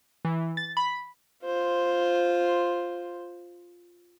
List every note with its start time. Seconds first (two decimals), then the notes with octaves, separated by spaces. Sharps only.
0.25 E3
0.57 A6
0.77 B5
1.44 F4 C5